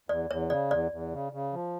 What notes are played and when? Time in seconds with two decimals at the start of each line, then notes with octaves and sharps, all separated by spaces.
0.09 E2 D5
0.30 E2 C#5
0.50 C#3 D5
0.71 E2 D5
0.92 E2
1.12 C#3
1.33 C#3
1.53 F3